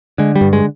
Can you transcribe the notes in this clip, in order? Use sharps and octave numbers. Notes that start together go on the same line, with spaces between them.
D3 G#3
G3
G2
G#3